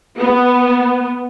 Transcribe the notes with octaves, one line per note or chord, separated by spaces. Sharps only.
B3